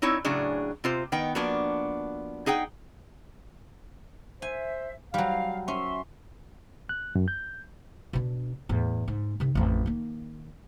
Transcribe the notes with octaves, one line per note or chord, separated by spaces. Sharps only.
C4 D#4 E4 C#5
A2 C#3 F#3 D4 G#4
C3 F4 C5
D#3 B3 G5
F3 A#3 B3 D4 F#4
D#4 G#4 F#5 G5
C5 E5 G#5
F#3 G3 F5
C#4 E5 C6
F#6
F#2
G6
B2 D4
E2 A2
G#2
C3 D#3
A1 F2
D#3 A#3